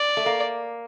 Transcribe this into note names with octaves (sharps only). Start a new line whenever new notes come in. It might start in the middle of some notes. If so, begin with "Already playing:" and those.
Already playing: D5
A3
A#3